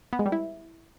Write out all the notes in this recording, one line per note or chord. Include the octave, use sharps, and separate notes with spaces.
B3
G#3
G3
E4